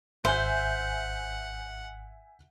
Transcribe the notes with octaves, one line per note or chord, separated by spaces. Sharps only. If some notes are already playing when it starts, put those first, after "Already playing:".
G#1 C5 E5 F#5 G#5 G6